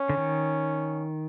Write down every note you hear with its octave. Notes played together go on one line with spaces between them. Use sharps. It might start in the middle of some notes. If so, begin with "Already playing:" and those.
Already playing: C#4
D3
D#3